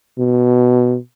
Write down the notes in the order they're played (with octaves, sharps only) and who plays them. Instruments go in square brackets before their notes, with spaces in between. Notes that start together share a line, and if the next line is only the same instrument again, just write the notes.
[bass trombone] B2